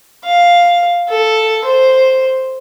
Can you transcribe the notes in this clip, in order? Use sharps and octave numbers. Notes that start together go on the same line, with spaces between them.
F5
A4
C5